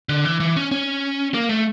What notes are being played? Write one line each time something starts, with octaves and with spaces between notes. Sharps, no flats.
D3
E3
E3
C#4
C#4
A#3
A3